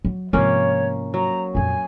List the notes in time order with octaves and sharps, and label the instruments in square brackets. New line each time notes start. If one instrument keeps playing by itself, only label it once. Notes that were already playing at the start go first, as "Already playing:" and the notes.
[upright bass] F#3
[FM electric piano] G#2 C3 F3 [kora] A#3 C#4 [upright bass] B3 E4 [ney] C#5
[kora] F#3 [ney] A#5
[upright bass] F2 A#2 [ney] G#5